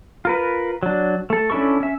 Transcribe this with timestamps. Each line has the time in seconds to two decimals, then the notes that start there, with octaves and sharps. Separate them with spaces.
0.25 F4 A#4 B4
0.83 F#3 D4
1.30 A3 A4
1.50 C#4 D4 E4 A4 C#6
1.80 C#4 E5